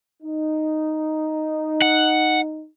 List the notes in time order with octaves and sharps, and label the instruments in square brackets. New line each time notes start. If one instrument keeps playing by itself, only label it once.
[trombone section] D#4
[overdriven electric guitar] F#5